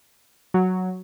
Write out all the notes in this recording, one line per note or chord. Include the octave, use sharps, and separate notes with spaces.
F#3